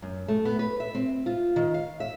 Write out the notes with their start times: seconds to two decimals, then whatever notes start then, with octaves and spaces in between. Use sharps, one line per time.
0.02 F#2
0.28 A3
0.45 B3
0.59 B4
0.80 E5
0.95 C4
1.26 F4
1.56 D#3
1.74 F5
2.00 E5